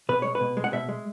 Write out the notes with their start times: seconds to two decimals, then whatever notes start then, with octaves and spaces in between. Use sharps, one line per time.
0.09 B2 B4
0.22 G#3 C#5
0.35 B4
0.41 B2
0.57 G#3
0.64 F#5
0.73 B2 E5
0.89 G#3